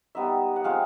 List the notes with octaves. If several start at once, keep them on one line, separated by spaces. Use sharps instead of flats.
G3 B3 D#4 E5
F#5
F3 G#3 C4 F5